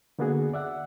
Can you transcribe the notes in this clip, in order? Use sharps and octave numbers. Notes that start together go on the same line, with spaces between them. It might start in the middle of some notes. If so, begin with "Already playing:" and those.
D3 A#3 B3 D4 F#4 G#4
D5 E5 F#5